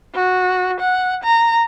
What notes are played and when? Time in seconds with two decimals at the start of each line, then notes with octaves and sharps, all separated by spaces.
0.15 F#4
0.80 F#5
1.24 A#5